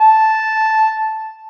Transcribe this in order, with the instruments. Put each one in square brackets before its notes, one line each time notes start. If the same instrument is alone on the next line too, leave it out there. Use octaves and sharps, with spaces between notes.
[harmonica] A5